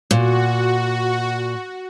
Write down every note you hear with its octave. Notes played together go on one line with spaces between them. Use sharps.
A#2 F#4